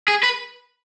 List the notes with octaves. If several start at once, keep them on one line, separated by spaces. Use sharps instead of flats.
G#4
B4